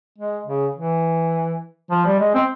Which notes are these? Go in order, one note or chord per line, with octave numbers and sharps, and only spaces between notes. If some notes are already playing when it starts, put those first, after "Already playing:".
G#3
C#3
E3
F3
G3
G#3
C4